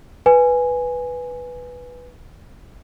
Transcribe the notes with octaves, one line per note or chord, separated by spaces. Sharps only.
B4 G#5